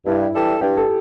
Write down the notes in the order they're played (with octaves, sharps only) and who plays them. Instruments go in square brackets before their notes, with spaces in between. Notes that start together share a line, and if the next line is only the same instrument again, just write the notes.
[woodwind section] G2 [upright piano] E4
[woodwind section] E3 G3 D4 A4
[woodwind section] G2 [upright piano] G4
[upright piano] A4